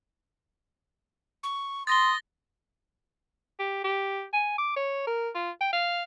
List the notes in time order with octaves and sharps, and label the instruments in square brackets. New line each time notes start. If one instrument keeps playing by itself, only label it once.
[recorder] C#6
[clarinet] C6 [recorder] D#6 [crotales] A6 A#6 G7
[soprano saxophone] G4
G4
G#5
D6
C#5
A#4
F4
G5
F5